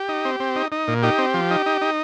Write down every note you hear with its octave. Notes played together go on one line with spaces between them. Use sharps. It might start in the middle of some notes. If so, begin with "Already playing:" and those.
Already playing: G4
D#4
C4
C4
D#4
D#4
A#2
D#4 G4
C4
F3
D#4
D#4
D#4